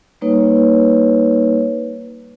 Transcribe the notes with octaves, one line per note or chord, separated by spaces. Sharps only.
G3 A#3 D#4 B4 C#5